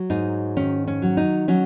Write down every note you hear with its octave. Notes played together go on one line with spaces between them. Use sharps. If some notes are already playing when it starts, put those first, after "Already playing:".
Already playing: F#3
G#2 D#4
D#3 C#4
C#4
F#3
D#4
F#3 C#4